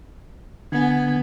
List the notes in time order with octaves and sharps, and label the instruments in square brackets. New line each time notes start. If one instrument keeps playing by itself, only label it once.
[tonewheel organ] D3 G#5 [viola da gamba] B3